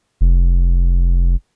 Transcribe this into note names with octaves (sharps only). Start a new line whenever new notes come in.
F1